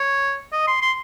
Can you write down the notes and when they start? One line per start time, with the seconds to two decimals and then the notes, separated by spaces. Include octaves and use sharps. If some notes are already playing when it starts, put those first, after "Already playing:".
Already playing: C#5
0.52 D#5
0.67 C6
0.82 C6